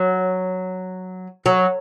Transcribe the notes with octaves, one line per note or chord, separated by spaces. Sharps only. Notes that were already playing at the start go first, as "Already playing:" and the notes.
Already playing: F#3
F#3